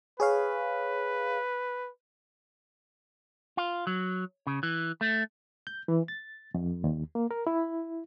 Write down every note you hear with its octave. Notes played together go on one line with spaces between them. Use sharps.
G#4 B4 C#5 F5
F4
F#3
C#3
E3
A3
G6
E3
A6
F2
D#2
A#3
A#4
E4